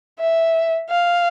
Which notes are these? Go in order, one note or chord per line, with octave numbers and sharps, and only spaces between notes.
E5
F5